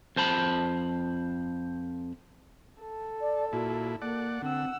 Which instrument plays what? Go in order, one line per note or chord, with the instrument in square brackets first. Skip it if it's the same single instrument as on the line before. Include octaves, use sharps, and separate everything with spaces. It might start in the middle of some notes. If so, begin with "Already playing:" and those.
[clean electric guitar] F2 C5 A5 B5
[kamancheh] A4
[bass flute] D5
[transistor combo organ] A#2 E4 [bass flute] F#4
[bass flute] A#3 [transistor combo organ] D5 F#5
[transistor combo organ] D3 [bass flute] C4 [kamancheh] F#5 E6